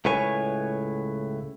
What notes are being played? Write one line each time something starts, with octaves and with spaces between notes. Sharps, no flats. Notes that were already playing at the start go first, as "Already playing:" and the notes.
C#2 A2 B4 C#5 G#5